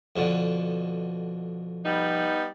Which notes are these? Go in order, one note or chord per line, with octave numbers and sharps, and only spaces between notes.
F2 B2 D3
G3 B3 D#4